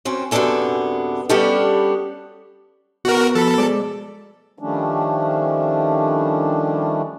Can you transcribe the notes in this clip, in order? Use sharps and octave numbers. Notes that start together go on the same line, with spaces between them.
F#2 C4 C#4
F#2 C3 B3 D4 A4 G#5
G3 B3 C#4 D4 G4 A4
B2 F#4 A#4
F3 A4 B5
G#3 C5 D5
D#3 F3 G3 A3 C#4 D4